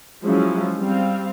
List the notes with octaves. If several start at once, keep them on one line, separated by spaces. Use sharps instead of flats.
F3 F#3 G#3 C#4 E4
G3 C4 F5